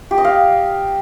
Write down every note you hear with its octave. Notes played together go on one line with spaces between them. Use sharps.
G4
D#5
F5